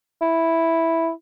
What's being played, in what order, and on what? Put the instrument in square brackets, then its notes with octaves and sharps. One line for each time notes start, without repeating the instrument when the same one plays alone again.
[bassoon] E4